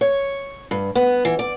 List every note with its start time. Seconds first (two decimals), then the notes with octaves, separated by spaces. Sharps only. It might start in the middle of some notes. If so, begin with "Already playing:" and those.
0.01 C#5
0.71 G2
0.95 B3
1.25 E3
1.39 D5